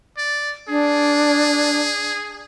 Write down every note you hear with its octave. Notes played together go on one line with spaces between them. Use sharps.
D5
D4 G#4